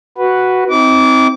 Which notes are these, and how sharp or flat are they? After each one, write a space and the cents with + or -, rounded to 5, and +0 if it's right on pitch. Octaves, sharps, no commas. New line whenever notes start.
F#4 +0 B4 -5
C4 +0 D#4 +40 D6 -25